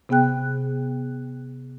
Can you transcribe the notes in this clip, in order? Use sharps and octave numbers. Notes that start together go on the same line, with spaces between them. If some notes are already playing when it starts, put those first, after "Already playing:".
C3 B3 G#4 G5 F#6